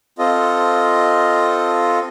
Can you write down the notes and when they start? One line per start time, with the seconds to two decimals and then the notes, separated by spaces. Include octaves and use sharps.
0.19 C4 F4 A4 D#5